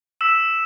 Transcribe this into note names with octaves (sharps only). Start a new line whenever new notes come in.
E6 B6 E7